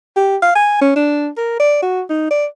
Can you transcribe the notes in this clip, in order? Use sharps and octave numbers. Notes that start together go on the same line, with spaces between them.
G4
F5
G#5
C#4
D4
A#4
D5
F#4
D#4
D5